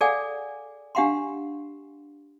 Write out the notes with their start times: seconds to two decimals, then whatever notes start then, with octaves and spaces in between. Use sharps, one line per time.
0.01 G#4 A4 D5 F5 F#5 G#5
0.95 D4 G4 F5 F#5 A#5 C6